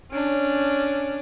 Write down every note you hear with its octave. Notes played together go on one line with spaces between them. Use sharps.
C#4 D4